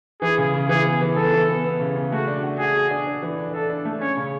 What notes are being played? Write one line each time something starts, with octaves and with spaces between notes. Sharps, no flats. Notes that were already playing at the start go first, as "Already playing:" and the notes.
E3 G#4
C#3
C#3
E3 G#4
B3
E3
B3 A4
E3
B3
B3
C#3
C#3
A3 F#4
D4
F#4
F#4 G#4
F#4
D4
D4
E3
D4
D4 A4
D4
A3
C#4 C#5
C#3